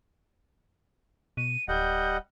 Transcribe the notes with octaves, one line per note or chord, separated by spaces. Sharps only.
B2 D#7
D1 G3 D#5 F#5 G6